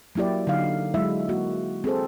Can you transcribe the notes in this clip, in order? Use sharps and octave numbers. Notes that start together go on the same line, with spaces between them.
F#3 A#3 E4 G4 D5
D3 F#3 D#4 F5
F#3 G#3 E4 E5
A#3 F#4
C4 G#4 A4 C5